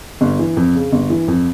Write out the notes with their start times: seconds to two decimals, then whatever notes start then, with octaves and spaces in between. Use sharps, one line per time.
0.21 G1
0.39 E3
0.57 F2
0.75 C#3
0.92 G1
1.10 E3
1.28 F2